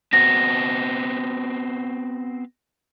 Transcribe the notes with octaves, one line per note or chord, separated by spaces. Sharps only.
B3 C4 F#4 A#6